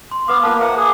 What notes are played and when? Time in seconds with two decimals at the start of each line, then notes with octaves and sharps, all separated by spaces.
0.11 C6
0.28 B3 B4 F5 D6
0.43 A#3 F4 B4 F#5 A5
0.60 C5 E5 F#5 A#5
0.77 G#4 A#4 D6